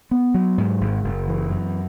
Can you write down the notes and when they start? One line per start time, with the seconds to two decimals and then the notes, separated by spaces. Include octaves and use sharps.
0.11 B3
0.34 F#3
0.58 G#2
0.81 G#1
1.04 F#1
1.27 E3
1.51 F#2